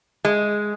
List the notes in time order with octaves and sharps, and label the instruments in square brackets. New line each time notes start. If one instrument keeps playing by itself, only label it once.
[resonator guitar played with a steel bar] G#3